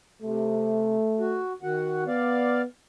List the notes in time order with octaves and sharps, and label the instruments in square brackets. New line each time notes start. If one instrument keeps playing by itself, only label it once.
[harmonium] C3 [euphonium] A3
[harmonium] F#4
D#3 F#4 F#5
[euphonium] B3 [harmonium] D5 F5